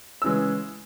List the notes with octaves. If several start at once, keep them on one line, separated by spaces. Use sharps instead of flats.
C#3 E3 G#3 E6